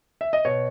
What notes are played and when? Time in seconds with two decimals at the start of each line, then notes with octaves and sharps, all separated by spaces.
0.21 E5
0.33 D#5
0.45 B2 C#5